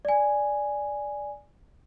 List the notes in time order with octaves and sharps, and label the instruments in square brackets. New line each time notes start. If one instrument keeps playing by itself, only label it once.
[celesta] D5 G#5